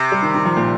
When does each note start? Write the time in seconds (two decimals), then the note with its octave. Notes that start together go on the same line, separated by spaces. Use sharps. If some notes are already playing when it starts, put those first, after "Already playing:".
Already playing: C3
0.12 G3
0.22 D#3
0.35 D#3
0.45 F3
0.57 A#2